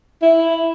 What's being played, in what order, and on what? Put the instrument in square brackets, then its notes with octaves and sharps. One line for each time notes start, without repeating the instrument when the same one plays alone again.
[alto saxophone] E4